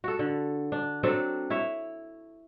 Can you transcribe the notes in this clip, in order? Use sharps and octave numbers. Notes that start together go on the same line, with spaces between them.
F#4 A4
D3
D4
F#3 C4 D4 A4
E4 C#5 E5